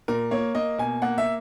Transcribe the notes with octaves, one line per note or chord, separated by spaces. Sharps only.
A#2 A#4
A#3 C#5
A#3 D#5
B2 G#5
A#3 F#5
E5